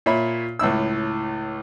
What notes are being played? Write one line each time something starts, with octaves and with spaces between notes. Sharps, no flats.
A#2 C#5 E5 B5
C#2 A2 E4 E6